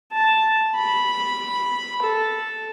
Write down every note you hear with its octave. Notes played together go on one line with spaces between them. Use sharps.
A5
B5
A4